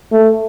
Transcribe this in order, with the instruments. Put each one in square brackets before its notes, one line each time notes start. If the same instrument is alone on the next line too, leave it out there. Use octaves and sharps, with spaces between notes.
[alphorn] A3